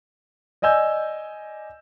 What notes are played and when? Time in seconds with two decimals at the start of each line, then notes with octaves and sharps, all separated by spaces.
0.62 D5 D#5 G#5 E6 G6